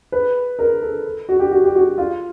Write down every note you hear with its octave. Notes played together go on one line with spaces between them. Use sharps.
B4
A#4
A4
F#4
G4
F#4
G4
F#4
F4